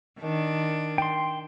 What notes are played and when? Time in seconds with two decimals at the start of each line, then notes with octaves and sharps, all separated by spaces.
0.20 D#3 D4
0.98 G5 C6